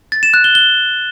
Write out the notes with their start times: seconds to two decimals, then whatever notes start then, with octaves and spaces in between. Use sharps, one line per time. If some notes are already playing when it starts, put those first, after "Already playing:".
0.12 A6
0.23 E7
0.34 F#6
0.44 G7
0.55 G7